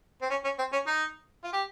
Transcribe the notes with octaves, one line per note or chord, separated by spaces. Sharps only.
C4
C#4
C#4
C4
C#4
D#4
F4
G4